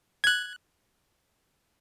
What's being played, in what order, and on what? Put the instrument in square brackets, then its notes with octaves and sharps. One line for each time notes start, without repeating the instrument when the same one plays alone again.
[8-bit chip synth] F#6 G#6